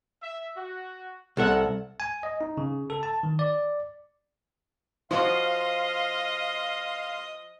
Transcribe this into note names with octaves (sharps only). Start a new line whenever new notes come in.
E5
F#4
C2 A4 A#4 E5 F#5
G#5
D#5
D#4
C#3
A4
A5
D#3
D5
F3 F4 F#4 D#5 F5 F#5 C6